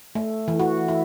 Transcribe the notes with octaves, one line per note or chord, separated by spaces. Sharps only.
A3
E3
F#4
E4